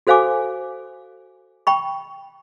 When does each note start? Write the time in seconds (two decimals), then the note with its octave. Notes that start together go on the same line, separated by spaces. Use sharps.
0.07 F#4 A4 C5 F5 G#5 D6
1.67 G5 B5 C#6